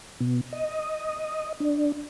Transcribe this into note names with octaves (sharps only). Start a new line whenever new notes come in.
B2
D#5
D4